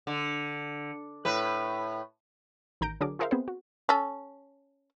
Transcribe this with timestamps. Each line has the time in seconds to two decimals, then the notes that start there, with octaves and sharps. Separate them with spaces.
0.07 D3
1.25 A2 B4
2.81 A1 D#3 A#5 G6 A#6 D7
3.01 D3 F#3 D4 G#4 A#4 D6
3.19 F4 G#4 A#4 C5 E5 F5
3.31 B3 C4 G#4 B4 C5
3.48 F#4
3.89 C#4 A4